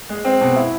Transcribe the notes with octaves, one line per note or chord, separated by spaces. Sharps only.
G#3
C4
B2
E4